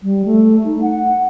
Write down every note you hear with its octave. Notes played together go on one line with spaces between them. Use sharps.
G3
A3
D#4
F#5